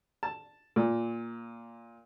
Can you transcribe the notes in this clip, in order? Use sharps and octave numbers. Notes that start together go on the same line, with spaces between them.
A5
A#2